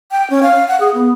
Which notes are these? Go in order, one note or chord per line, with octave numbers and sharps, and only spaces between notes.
G5
C#4
F5
F#5
G#4
B3